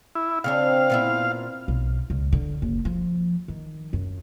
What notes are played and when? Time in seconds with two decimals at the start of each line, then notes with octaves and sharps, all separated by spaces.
0.15 E4
0.44 C#3 C4 D4 F5
0.90 A#2 B3 E4
1.68 B1
2.10 C#2
2.32 D3
2.62 F#1
2.85 F3
3.48 D#3
3.93 F#2